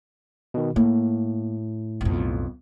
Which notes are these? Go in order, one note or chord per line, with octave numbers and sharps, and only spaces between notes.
B2 D#3
A2 A#3
B1 F2